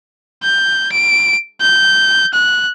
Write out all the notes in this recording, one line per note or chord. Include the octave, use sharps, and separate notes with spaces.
G6
D7
G6
F#6